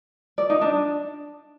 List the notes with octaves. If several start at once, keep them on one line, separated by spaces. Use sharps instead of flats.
D5
D#4
D4